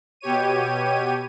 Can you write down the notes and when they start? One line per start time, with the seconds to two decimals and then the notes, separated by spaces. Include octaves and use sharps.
0.21 B2 G4 C#5 D#7